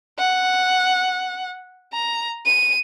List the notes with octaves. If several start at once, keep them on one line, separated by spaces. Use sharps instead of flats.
F#5
A#5
D#7